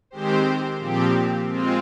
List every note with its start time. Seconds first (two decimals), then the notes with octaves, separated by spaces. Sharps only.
0.11 D#3 G#3 C4 G4 C5
0.79 A#2 F3 C4 G4
1.49 G#3 C4 F4